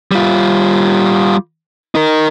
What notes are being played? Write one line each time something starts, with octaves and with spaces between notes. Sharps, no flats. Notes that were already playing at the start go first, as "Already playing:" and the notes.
G3 F4
D#4 A#4